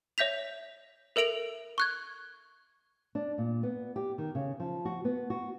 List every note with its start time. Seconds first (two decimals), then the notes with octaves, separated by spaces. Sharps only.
0.18 C#5 E5 G6 B6 F7
1.16 A4 A#4 E5 D7 F7 F#7
1.78 C#6 F#6 G#6
3.15 D4
3.38 A#2
3.63 B3
3.96 G4
4.18 D#3
4.35 C#3
4.60 F3
4.85 F#4
5.05 B3
5.30 F#4